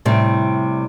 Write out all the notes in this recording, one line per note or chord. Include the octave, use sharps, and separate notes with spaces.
A2 C3 G3